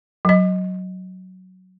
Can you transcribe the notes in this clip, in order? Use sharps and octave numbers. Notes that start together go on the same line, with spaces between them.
F#3 D#5